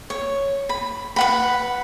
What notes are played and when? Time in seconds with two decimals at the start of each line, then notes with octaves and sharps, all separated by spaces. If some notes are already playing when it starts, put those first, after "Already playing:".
0.10 C#5
0.69 B5
1.16 B4 F#5 B5